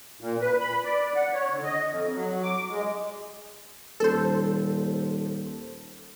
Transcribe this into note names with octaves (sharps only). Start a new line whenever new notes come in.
A#2
B4
B5
D5
F#5
C#5
D3
D#5
F2
F#3
D6
G#3
D#1 A4 C5